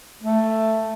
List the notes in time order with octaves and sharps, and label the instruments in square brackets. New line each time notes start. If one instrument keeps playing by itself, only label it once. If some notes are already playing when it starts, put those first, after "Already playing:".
[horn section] A3